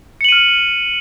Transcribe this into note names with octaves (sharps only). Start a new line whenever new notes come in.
F6 C#7 D#7 F#7